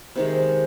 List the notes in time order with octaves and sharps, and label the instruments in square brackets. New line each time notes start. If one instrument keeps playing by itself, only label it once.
[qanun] C3 D#3 G#3